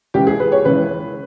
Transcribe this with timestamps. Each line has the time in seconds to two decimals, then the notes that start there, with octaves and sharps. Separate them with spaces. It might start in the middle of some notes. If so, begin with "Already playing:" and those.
0.14 C#2 C#3 E3 G4
0.27 G#4
0.40 B4
0.52 C#5
0.65 C#2 C#3 E3 B4